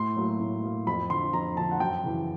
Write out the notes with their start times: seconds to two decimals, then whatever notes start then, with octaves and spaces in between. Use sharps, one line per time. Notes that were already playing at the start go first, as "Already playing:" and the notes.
Already playing: A2 C6
0.17 F#3 A#3
0.40 A2
0.63 F#3 A#3
0.87 F2 B5
1.10 D3 F3 C6
1.33 F2 A#5
1.57 D3 F3 A5
1.71 F#5
1.80 F#2 G5
2.04 C#3 E3